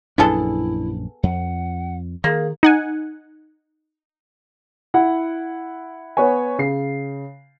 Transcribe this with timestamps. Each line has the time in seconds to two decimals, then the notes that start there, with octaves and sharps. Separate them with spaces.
0.18 A#1 F#2 B3 D4 E4 G#4 A4
1.23 F2 F#5
2.24 D#3 A#3 G#4
2.63 D#4 F#5 G#5
4.94 E4 F#5
6.17 B3 B4 C#5 G#5
6.58 C#3 C7